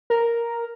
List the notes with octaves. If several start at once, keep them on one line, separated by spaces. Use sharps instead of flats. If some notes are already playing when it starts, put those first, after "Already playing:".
A#4